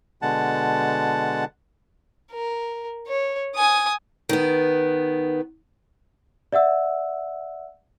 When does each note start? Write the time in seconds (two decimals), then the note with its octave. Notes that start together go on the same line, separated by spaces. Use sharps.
0.22 B2 D3 G#3 F#5 A5
2.32 A#4
3.07 C#5
3.56 G#5 D#6
4.29 D#3 B3
6.53 D5 E5 F#5 E6